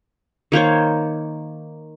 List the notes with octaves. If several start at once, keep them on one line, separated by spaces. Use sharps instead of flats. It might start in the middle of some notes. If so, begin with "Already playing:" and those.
D#3 A#3 C5 C#5